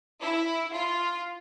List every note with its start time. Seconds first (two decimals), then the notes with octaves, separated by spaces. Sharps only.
0.21 E4
0.72 F4